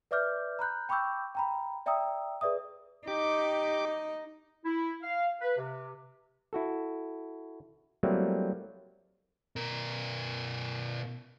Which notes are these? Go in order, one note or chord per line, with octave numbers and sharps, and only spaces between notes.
B4 D5 E5 D6 F6 G6
A#5 B5 F#6 G6
G5 B5 C#6 D6 E6 G6
G5 A#5 B5
D5 E5 G5 A#5 D#6 E6
G#4 B4 D5 E5 D#6
D#4 G4 D6
E4
F5
B4
C3
E4 F#4 A4
F#3 G3 A3 A#3 C4 E4
B2 A#4